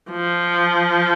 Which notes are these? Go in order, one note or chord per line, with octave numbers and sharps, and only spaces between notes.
F3